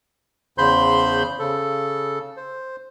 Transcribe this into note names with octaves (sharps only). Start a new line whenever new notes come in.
E2 C#3 C5 B5 C6 G6
C#3 A4
C5